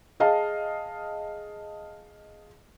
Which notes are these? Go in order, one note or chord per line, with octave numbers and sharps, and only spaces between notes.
G#4 D#5 F5 A5